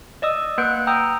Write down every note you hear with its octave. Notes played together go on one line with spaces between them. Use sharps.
D5 D#5 D#6 E6
A#3 B4 F#5 F#6 G6 D7
G5 A#5 D#6 E6 G6